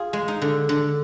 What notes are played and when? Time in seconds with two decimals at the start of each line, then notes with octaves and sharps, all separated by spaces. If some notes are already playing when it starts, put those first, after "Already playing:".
Already playing: F4 G#4
0.13 G#3
0.28 D#4
0.42 D3
0.69 D3